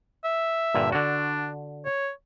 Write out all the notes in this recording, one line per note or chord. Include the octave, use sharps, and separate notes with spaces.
E5
G2 A#2 D3
D3 D4 F#4
C#5